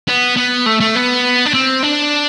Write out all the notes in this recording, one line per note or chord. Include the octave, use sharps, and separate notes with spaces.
B3
B3
A3
A3
B3
D4
C4
D4